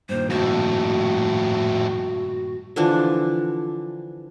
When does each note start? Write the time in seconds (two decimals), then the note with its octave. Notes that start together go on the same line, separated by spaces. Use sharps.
0.09 G2 A#2 D#3 C5
0.30 F2 A2 F#4
2.76 D3 E3 F3 D4